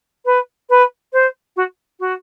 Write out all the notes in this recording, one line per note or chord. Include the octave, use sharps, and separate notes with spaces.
B4
B4
C5
F#4
F#4